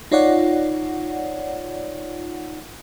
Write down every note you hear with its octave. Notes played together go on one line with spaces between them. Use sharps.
D#4 F4 C#5 D5 F#5